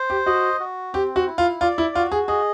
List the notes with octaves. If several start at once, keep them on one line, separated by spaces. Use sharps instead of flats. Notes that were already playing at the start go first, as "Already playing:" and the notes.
Already playing: C5
G4
F#4 D#5
F#4
C4 G4
F#4
E4
F4
F4 D5
E4
F4 F#4
G#4
G#4 D#5